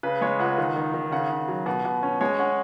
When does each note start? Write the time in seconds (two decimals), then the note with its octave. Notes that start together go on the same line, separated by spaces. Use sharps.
0.03 C#3 B4
0.21 G#3 C#5
0.39 C#2 F#5
0.58 D#3
0.76 D#3
0.94 D#3
1.12 C#3 F#5
1.30 C#3
1.48 F#3
1.66 B2 F#5
1.85 B2
2.03 C#4
2.21 G#3 C#5
2.39 C#4 F#5